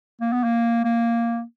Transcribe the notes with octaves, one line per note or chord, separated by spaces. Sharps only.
A#3
B3
A#3
A#3